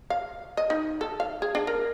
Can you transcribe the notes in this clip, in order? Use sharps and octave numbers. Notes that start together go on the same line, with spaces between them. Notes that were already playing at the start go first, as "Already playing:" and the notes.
F5
D#5
D#4
A4
F5
G#4
D4
A#4